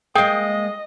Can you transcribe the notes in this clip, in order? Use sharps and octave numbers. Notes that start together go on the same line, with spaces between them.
G#3 A#3 G#4 D#5 F5 G5